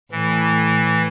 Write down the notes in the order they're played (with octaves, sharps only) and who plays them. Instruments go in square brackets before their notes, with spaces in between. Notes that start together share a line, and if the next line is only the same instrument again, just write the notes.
[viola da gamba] A2 [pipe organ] E3